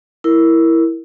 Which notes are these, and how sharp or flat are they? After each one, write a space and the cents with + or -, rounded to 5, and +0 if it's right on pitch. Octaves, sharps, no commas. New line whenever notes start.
E4 +0 A#4 +0